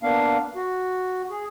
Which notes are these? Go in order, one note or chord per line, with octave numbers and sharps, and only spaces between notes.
A#3 B3 D4 F5
F#4
G#4